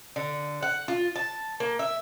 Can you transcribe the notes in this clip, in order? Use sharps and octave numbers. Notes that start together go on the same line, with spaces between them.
D3
F#5
F4
A5
A#3
E5